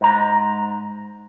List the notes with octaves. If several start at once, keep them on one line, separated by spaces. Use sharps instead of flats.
G#2 A#5